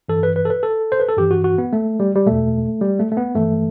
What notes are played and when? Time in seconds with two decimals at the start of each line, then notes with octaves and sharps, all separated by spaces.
0.08 G2 E3 A4
0.23 B4
0.36 B4
0.45 A4
0.50 B4
0.63 A4
0.92 C5
1.00 B4
1.08 A4
1.17 G2 E3 G4
1.31 F#4
1.44 F#4
1.58 B3
1.73 A3
2.00 G3
2.15 G3
2.26 E2 B2 A3
2.81 G3
2.99 A3
3.12 A3
3.17 B3
3.35 G2 E3 A3